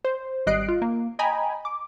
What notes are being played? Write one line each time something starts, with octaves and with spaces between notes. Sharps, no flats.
C5
G#1 G3 D#5 F#6 C7 D7
F4
A#3
D#5 G5 G#5 A#5 B5
D6